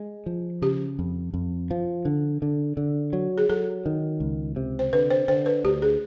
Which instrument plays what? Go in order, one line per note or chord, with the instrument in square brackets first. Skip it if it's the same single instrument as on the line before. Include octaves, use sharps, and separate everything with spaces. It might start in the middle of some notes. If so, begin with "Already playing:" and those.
Already playing: [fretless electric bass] G#3
F3
[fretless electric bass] C#3 [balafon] G4
[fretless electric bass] F2
F2
F3
D3
D3
D3
F#3
[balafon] G#4
[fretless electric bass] F#3 [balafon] A4
[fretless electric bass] D#3
C#2
C3
[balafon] C5
[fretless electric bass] D3 [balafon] B4
[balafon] C5
[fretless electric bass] D3 [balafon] C5
[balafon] B4
[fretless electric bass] D2 [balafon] G4
[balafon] G#4